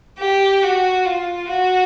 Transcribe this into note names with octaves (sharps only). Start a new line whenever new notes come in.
G4
F#4
F4
F#4